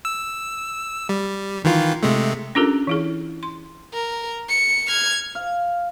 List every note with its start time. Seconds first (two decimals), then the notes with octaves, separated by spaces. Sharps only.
0.05 E6
1.09 G3
1.64 D#3 E3 F4
2.03 C3 G#3 A3
2.55 C#4 D4 F4 G4 A4 A#4
2.87 E3 E4 G#4
3.43 C6
3.93 A#4
4.49 C#7
4.87 F6 G#6
5.35 F5